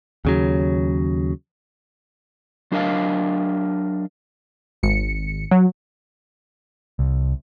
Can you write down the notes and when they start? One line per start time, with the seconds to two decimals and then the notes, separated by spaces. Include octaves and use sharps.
0.25 D#2 C#3 F#3
2.72 F#3 D4 A#4 D#5 F5
4.83 G#1 C#7
5.51 F#3
6.99 C2